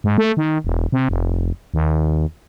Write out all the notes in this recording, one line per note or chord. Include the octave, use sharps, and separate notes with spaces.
G#2
A3
D#3
E1
C3
F1
D#2